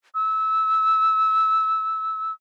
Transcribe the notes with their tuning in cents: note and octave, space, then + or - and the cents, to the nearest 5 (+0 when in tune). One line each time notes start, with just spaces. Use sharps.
E6 -20